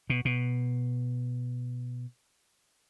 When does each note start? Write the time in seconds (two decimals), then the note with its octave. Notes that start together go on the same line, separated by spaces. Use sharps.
0.10 B2
0.25 B2